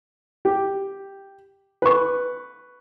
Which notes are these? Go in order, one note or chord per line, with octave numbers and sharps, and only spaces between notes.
G4
B4 C#6